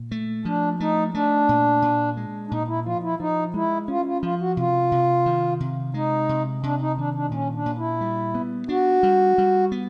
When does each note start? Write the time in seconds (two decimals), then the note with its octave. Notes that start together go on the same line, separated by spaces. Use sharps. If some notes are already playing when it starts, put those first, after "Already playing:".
Already playing: A#2
0.11 A3
0.45 F3 D4
0.80 A3 D#4
1.14 A3 D4
1.49 A#2
1.82 A#2
2.17 G#3
2.47 D4
2.51 A#2 D#4
2.68 E4
2.85 F3 F4
3.03 E4
3.20 F3 D#4
3.54 G#3 E4
3.88 C#4 F4
4.05 F4
4.22 F3 F4
4.40 F#4
4.57 C3 F4
4.92 C3
5.26 D#3
5.60 C3
5.94 G#3 D#4
6.29 C3
6.63 C3 D4
6.80 D#4
6.97 D#3 D4
7.14 D4
7.31 A#2 C#4
7.55 D4
7.66 A#2
7.78 E4
8.01 G3
8.35 B3
8.69 D4 F#4
9.03 G3
9.38 G3
9.72 B3